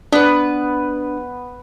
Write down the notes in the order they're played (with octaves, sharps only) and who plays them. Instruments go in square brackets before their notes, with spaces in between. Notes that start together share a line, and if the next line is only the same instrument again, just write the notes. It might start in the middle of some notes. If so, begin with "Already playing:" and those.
[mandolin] B3 B4 [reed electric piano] D4